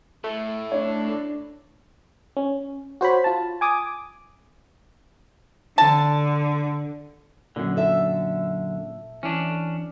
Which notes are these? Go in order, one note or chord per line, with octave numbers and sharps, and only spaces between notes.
A2 A3
D4 C#5
C#4
F#4 C5 C#5 B5
F4 A5
G#5 D6 D#6
D3 A5
F#2 A#2 D3
A4 E5
E3 C#4 D4